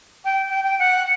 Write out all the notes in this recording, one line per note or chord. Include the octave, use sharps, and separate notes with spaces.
G5
G5
G5
F#5